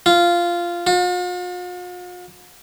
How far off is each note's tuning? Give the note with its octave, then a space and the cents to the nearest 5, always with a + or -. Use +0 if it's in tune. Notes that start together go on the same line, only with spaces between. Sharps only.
F4 -10
F4 +45